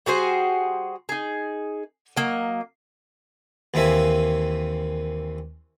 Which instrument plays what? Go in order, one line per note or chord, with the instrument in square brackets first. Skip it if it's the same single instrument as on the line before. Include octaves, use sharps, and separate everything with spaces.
[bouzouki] G3 F#4 G#4 C5
D#4 G#4
F#3 A#3 D#5
[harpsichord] D#2 E3 A#3 C4 E5 G#5